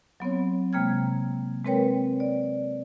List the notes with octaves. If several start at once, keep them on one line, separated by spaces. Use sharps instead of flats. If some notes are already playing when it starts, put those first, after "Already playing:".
F#3 B3 C4 C#5
C3 G#3 A#3 G5 F6 G#6
G#3 C4 A#4 B4 C#5 G5
D5